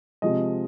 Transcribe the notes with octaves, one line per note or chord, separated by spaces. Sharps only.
C3 F3 G#3 D#5